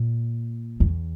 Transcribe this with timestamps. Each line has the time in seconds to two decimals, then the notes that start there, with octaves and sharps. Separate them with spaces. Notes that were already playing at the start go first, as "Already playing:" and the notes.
Already playing: A#2
0.80 E2